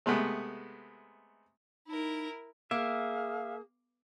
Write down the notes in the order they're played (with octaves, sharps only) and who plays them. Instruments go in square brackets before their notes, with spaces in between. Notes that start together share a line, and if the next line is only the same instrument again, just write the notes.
[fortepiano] C3 G#3 A3 B3
[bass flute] D#4 [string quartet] E4 A#4
[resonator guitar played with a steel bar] A#3 [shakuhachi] G#4 [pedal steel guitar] E5 [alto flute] F5